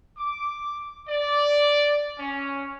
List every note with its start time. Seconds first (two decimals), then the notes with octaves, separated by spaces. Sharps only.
0.17 D6
1.08 D5
2.19 C#4